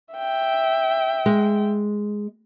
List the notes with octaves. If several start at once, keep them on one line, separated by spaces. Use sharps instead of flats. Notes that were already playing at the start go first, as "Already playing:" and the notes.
E5 G5
G#3